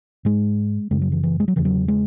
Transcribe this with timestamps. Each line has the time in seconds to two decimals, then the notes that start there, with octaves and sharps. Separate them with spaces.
0.25 G#2 G#3
0.91 F#2 C#3 G#3
1.02 F#3
1.12 E3
1.23 E3
1.40 G#3
1.48 F#3
1.56 E2 C#3 E3
1.65 F#3
1.88 G#3